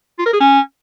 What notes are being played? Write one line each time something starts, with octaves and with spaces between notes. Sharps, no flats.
F4
A#4
G#4
C#4